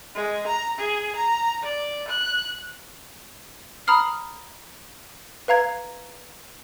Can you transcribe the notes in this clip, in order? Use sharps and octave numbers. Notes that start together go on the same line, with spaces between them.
G#3
A#5
G#4
A#5
D5
F#6
A#5 B5 D#6 F6 C7
B4 F5 A#5 G#6